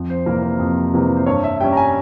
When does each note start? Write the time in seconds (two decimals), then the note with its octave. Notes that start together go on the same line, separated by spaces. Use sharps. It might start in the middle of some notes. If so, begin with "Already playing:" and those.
Already playing: F2
0.10 C5
0.26 C3 E3 G3 A#3 A#4
0.43 C5
0.60 F2
0.93 C3 E3 G3 A#3
1.17 C5
1.26 G2 C#5
1.44 E5
1.60 G3 C#4 G5
1.73 A#5
1.77 G#5